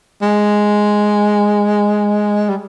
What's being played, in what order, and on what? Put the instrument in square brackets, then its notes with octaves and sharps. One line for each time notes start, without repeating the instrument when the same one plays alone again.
[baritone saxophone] G#3
G3